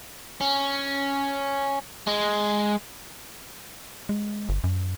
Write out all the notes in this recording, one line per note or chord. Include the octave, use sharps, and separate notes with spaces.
C#4
G#3
G#3
G1
F#2